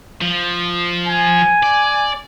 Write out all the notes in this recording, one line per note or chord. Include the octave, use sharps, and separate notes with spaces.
F3
G#5
D5